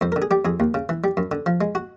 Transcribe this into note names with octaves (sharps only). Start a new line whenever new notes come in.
F2 C5
A#4
D3
G#4
G3 G4
F2 G#4
D#2
C#3
E3
G3
F#2
D3
F3
G#3
F#4